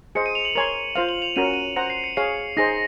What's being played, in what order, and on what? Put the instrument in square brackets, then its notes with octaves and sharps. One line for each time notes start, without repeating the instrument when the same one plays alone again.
[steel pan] G#4 C5 D#5 [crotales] C#7
[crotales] D#7
F7
F#7
[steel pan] A#4 C#5 G#5 C6 [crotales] F7
[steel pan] F4 C5 F5 [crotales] F7
[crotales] F#7
F7
[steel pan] C#4 F#4 A#4 [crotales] D#7
[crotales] C#7
D#7
[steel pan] C5 F#5 A#5 [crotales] C#7
[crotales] C7
C#7
[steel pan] G#4 C#5 F5 [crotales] C7
[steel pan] D#4 G#4 C5 [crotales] A#6